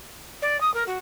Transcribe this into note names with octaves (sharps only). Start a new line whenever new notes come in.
D5
D#6
A#4
F#4